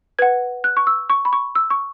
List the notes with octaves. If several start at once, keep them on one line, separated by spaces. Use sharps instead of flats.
B4 F#5 G#6
F#6
C#6
E6
C#6
B5
C#6
E6
C#6